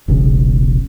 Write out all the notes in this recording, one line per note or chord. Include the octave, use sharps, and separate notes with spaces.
E1 B1 C#3